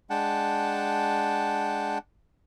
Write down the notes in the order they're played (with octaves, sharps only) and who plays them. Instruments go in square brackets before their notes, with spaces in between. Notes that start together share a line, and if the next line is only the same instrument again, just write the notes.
[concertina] G#3 D4 F#5 G5 A5